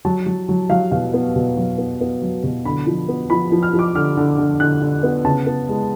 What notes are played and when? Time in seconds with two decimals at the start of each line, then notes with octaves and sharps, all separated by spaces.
0.05 F#3 A5
0.26 F#3
0.49 F#3
0.70 F#3 F5
0.91 B2 F5
1.14 B3
1.35 B2
1.57 F#3
1.78 B3
2.01 B3
2.22 F#3
2.43 B2
2.65 D3 B5
2.87 F3
3.08 B3
3.30 F3 B5
3.52 F3
3.63 F6
3.73 F3
3.79 D6
3.95 D3 F6
4.17 D3
4.38 D3
4.60 D3 F#6
4.82 D3
5.03 B3
5.24 C#3 A5
5.46 B3
5.68 G#3